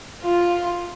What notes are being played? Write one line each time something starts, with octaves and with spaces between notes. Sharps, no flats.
F4